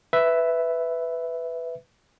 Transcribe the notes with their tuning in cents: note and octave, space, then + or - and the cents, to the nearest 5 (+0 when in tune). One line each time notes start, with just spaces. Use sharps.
B4 +10 E5 +0